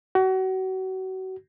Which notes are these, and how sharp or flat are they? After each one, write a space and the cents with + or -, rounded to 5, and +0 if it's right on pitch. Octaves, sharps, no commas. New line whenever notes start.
F#4 +30